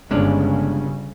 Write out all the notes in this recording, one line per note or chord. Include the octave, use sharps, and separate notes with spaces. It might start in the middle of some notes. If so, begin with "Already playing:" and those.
G1 C#3 G#3 C#4 D4